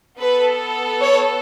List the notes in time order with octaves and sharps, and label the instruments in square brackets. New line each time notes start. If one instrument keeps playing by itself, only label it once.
[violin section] B3 A4 B4
C#5